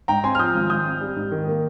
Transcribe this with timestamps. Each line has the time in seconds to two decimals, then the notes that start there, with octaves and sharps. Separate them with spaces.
0.08 G#2 G5 A#5
0.24 C4 G#5 C6
0.35 F6
0.39 F3 D#6 G6
0.55 G#1
0.70 G#2 D#6 G6
0.86 C4
1.01 G3
1.16 G#2
1.31 D#3
1.47 A#3